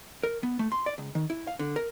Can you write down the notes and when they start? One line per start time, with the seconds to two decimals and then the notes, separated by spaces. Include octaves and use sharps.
0.23 A#4
0.43 B3
0.59 A3
0.72 C6
0.86 D5
0.98 C#2
1.15 D#3
1.30 E4
1.47 F5
1.59 D3
1.76 A#4